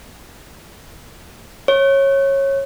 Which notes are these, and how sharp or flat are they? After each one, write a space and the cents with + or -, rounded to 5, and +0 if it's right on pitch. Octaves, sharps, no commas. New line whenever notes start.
C#5 -20